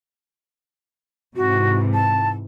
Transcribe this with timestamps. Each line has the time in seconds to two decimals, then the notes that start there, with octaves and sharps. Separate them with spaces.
1.36 G#2 C3 E3 F#4
1.94 A5